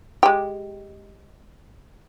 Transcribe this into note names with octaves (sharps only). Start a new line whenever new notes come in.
G#3 G4